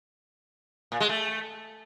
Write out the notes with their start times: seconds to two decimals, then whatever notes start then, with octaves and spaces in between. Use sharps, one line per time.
0.92 A#2
1.00 G#3
1.09 A3